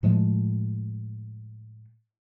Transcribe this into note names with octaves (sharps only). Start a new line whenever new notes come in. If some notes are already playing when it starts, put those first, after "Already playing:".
A2 F3 G#3 A3